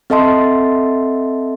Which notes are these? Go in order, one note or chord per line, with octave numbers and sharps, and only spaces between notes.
C4 A4 D#5 E5 A5 C6